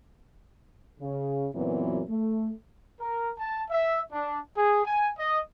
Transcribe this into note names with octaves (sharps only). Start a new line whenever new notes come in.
C#3
F#2 A#2 E3 F#3 B3 C4
A3
A#4
A5
E5
D4
G#4
G#5
D#5